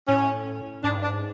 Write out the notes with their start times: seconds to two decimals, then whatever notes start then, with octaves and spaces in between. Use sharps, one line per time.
0.08 A2 C#4
0.84 G#2 D4
0.96 G2
1.03 D4
1.07 G#2